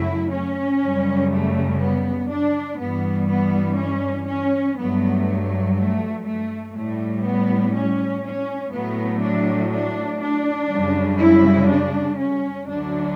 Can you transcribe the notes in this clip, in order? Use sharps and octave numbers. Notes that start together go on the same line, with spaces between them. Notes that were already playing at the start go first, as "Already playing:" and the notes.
Already playing: F#2 C#3 F#3 A3 E4
C#4
F#2 C#3 G3
A3
B3
D4
G2 E3 G3 B3
B3
C#4
C#4
G2 F#3 A3 B3
A3
A3
A2 G3 A3
B3
C#4
C#4
A2 F#3 A3 B3
D4
D4
D4
F#2 C#3 G3
E4
D4
C#4
D2 D3 F#3 D4